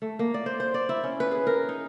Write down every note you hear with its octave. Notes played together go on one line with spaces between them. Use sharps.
A3
A#3
D5
C5
C5
D5
E4
C#4
B4
G#4
A#4
D#4